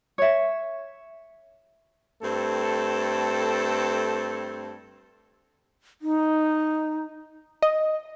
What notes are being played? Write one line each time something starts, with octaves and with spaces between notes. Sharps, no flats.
C#5 E5
G2 A3 C4 A4
D#4
D#5